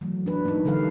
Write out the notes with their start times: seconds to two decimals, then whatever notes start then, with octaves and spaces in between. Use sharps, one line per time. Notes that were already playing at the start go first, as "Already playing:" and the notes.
0.01 E3 F#3 A3
0.26 D4 B4
0.45 A#3 D#4
0.65 D3 E3 G3 A4 B4 F5